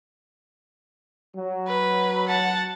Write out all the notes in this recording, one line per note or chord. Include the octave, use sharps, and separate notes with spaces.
F#3
B4
F#5 A5